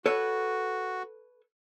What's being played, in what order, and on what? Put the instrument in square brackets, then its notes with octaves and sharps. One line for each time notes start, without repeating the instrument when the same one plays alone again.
[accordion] F#4 [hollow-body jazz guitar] A4 B4 C#5